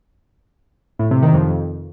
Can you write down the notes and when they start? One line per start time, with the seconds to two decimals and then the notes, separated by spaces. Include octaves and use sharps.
0.99 A2
1.11 C3
1.22 D#3
1.34 F2